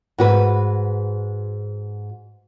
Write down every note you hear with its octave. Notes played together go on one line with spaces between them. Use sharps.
G#2 F#4 B4